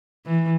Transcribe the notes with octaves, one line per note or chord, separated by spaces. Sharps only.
E3